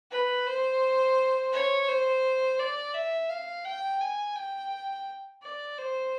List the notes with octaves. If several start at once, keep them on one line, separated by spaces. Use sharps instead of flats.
B4
C5
C#5
C5
D5
E5
F5
G5
G#5
G5
D5
C5